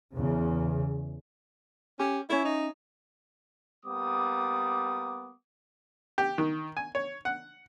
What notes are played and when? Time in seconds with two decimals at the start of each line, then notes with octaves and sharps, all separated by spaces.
0.13 E2 C#3
1.99 C#4 G4
2.30 C#4 E4 C#5 E5
2.45 D#4
3.86 G3 A#3 B3 D6 D#6
6.18 G4
6.38 D#3
6.77 G#5
6.95 C#5
7.25 F#5